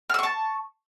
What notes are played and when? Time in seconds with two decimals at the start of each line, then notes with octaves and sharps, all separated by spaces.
0.10 F6
0.14 E6
0.19 C#6
0.23 A5